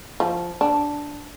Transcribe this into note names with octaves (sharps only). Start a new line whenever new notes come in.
F3
D4